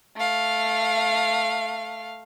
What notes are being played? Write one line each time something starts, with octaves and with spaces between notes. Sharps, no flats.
A3 F5